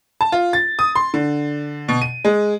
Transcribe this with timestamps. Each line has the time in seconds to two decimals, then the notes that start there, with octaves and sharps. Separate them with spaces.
0.21 A5
0.32 F4
0.53 A6
0.79 D#6
0.95 C6
1.14 D3
1.88 B2
2.02 D#7
2.25 G#3